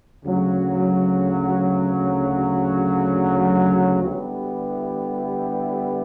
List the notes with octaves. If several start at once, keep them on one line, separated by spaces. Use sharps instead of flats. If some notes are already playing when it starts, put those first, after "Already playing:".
D2 C#3 F#3
D3 G3 B3 E4 G4